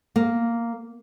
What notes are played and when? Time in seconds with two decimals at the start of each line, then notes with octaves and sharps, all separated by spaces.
0.16 A#3